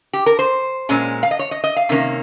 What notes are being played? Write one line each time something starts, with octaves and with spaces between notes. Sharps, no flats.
G4
A#4
C5
A#2 G#3 C#4
F5
D#5
C#5
D#5
D#5
F5
C3 D#3 A#3 C#4